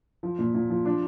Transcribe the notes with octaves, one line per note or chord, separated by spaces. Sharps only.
F3
A#2
A#2
F3
F3 D4